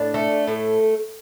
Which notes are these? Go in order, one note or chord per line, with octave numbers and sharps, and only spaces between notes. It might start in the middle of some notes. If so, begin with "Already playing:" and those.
Already playing: A2 D4 D5
A3
A2